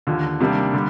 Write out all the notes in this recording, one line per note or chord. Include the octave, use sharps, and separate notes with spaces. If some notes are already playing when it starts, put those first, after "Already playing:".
D#2 D3 F3
C3 D#3 G3 A#3 D4
D3 G3